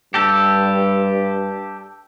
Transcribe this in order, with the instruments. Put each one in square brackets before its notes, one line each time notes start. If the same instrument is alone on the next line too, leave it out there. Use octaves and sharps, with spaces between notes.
[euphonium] G2 [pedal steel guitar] G4 A4